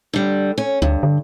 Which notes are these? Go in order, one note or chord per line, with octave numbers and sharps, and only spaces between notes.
D3 G3
C#4
D2 G2
D3